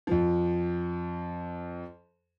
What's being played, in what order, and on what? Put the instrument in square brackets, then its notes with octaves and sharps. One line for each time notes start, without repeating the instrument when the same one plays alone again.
[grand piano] F2 F3